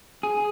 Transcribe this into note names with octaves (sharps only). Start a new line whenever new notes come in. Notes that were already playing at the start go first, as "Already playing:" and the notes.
G#4